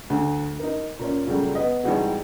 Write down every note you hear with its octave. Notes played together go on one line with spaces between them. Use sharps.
D2
D#4 A#4
A#2 A#3 C#4
A#2 C#3 F#3 G3 A3
B3 B4 D#5
G#1 D#3 E3 G3 F#4 G#4